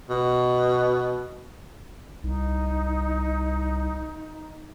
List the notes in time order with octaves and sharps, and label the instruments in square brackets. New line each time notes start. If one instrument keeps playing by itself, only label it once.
[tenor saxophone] B2
[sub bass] C2 [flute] D#4